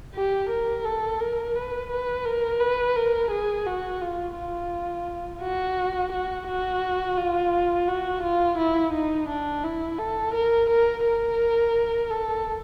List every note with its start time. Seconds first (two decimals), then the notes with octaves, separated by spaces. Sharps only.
0.15 G4
0.50 A#4
0.85 A4
1.20 A#4
1.55 B4
1.90 B4
2.25 A#4
2.60 B4
2.96 A#4
3.31 G#4
3.66 F#4
4.01 F4
4.36 F4
5.42 F#4
6.13 F#4
6.48 F#4
7.18 F4
7.88 F#4
8.23 F4
8.58 E4
8.93 D#4
9.29 D4
9.64 E4
9.99 A4
10.34 A#4
10.70 A#4
11.04 A#4
12.10 A4